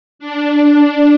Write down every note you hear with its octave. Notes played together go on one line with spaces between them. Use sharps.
D4